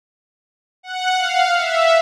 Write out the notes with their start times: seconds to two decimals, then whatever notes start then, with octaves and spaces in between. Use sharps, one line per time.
0.83 F#5
1.16 F5
1.56 E5